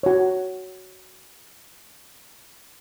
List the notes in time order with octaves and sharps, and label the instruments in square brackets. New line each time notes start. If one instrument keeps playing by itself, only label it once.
[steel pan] F#4 C#5